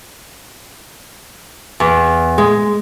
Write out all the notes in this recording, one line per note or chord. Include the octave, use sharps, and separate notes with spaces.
E2
G#3